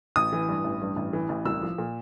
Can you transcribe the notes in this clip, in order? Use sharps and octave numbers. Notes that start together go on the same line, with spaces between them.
A1 D#6
E3
G2
A1
G2
A1
E3
A1
C2 E6
F3
A#2